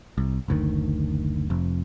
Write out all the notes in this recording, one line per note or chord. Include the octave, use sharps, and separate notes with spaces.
C2
F#1 D2 D#3
F1 F2